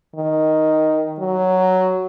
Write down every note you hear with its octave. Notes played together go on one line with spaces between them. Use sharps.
D#3
F#3